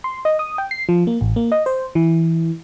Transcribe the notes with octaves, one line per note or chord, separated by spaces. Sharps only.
C6
D#5
D#6
G5
C7
F3
A#3
A1
A#3
D#5
C5
E3